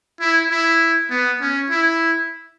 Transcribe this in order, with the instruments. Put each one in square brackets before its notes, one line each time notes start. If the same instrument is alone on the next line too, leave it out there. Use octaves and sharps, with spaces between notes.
[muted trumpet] E4
E4
B3
C#4
E4